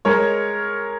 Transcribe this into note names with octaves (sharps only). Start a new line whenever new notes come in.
G#3 A#4 C#5